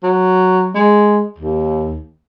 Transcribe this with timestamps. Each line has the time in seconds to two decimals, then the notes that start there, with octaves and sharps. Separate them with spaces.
0.03 F#3
0.75 G#3
1.38 D#2